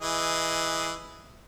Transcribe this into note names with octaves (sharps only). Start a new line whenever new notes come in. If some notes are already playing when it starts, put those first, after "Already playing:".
E3 G#4 D#5